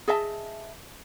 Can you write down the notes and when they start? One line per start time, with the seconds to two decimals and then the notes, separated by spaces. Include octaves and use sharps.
0.08 G#4 D#5 E5 A5